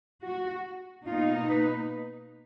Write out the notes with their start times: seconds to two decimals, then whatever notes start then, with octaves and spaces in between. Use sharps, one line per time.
0.25 F#4
1.07 B2 A#3 D#4 F4
1.49 B4